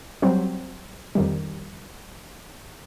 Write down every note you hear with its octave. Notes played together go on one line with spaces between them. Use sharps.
F#3 G3 C4
F2 D#3 G3